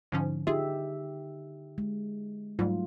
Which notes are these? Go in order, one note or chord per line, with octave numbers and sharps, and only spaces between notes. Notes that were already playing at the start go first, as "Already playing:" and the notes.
G#2 D3 F3 C#4
D#4 F4 G4 G#4 E5
G#3
G#2 F#3 G3 A3 F4